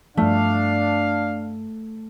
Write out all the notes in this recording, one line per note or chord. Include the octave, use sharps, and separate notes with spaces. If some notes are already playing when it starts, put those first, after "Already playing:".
G2 F3 A3 D4 F5